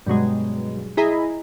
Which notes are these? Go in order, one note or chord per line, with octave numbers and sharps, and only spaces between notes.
G2 B2 F#3 G#3
E4 G#4 D#5 A#5 B5